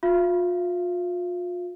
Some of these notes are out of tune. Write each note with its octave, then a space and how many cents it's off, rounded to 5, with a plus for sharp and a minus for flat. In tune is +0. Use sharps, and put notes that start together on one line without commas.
F4 +35 F5 -45